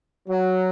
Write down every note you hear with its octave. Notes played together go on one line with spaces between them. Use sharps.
F#3